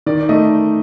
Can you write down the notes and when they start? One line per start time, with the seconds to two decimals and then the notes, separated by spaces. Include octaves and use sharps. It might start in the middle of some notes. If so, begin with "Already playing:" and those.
0.06 D#3 D5
0.21 D5
0.29 A3 D#4 D#5